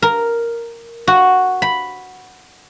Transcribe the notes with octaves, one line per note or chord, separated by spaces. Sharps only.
A#4
F#4
B5